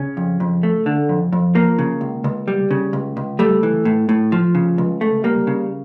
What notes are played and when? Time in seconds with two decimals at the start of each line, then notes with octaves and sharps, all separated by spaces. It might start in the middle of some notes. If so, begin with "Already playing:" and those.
Already playing: C#3 C#4
0.17 F2
0.40 F2
0.63 A3
0.86 D3
1.09 F2
1.33 F2
1.55 F3 A#3
1.79 C#3
2.01 C#2
2.24 C#2
2.48 G3
2.71 C#3
2.93 C#2
3.17 C#2
3.39 G3 A3
3.63 E3
3.85 A2
4.09 A2
4.32 F3
4.55 C#3
4.78 C#2
5.01 A3
5.24 G3 A#3
5.47 C#3